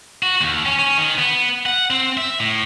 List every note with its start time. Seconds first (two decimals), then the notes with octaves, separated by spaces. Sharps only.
0.23 F#4
0.41 D#2
0.66 C#4
0.79 C#4
0.98 D#3
1.18 B3
1.66 F#5
1.90 C4
2.17 E5
2.40 A2